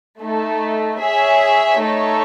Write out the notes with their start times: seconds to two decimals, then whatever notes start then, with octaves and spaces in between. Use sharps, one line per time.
0.20 A3 D#4 A4
1.00 G#4 C#5 E5
1.81 A3 D#4 A4 C#5